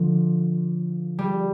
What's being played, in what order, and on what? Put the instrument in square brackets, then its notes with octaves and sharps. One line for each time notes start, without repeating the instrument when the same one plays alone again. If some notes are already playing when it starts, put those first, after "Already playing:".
Already playing: [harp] D3 F3
G3